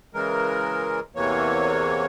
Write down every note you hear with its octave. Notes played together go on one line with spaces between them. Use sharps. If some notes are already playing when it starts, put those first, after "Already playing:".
C#3 E3 G#3 A#4
E2 C3 E3 A#3 C#5